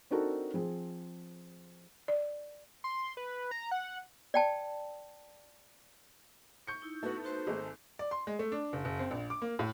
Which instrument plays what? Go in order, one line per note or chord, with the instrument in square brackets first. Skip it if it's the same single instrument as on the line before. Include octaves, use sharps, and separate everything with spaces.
[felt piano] C4 D4 D#4 F#4 A4 A#4
F3 C4 G#4
[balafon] D5
[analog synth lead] C6
B4
A#5
F#5
[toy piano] D5 G5 A5
[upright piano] C#6 G6 C#7
[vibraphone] D#4 E4
[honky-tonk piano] A3 B3 [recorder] F#4
[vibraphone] D#4 F#4 B4 [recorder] C5
[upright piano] G#1 [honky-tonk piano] G#3 A3 [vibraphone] E6
[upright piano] D5
C6
G#3
A3
D4
F#1
F#1
C4
A#1
D6
A#3
A2